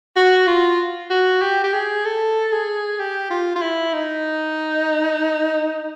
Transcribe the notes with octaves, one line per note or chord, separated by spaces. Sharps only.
F#4
F4
F#4
G4
G4
G#4
A4
G#4
G4
F4
F4
E4
D#4